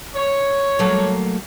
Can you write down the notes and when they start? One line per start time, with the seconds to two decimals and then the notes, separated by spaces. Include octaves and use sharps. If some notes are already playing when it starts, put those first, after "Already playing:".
0.14 C#5
0.79 F#3 A3 A#3